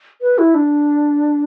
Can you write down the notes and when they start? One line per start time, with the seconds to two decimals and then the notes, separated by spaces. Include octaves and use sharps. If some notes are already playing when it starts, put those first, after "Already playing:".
0.22 B4
0.38 E4
0.55 D4